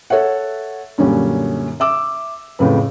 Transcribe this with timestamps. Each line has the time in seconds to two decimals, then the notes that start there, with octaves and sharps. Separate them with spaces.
0.10 A4 C#5 E5 F#5
0.98 F#2 A#2 D3 G3 C#4
1.80 E5 D6 E6
2.59 F2 A2 C#3 B4